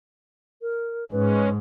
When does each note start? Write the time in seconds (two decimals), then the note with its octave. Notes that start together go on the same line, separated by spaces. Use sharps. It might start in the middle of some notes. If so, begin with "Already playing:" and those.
0.62 A#4
1.12 G#2 G#3 C#4 B4